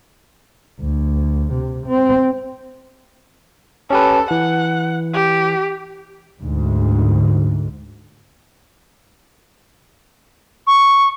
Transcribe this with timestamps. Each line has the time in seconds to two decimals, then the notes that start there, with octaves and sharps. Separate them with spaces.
0.80 D2
1.53 C3
1.87 C4
3.90 C#4 G4 A4 B4
4.31 E3 F#5
5.14 G4
6.40 D2 G#2
10.67 C#6